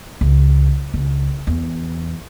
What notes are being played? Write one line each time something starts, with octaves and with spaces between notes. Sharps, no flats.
C#2
C#2
E2